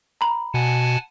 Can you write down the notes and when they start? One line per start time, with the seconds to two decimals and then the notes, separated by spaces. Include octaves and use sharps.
0.21 A#5 B5
0.54 B2 F#5 G#5 A5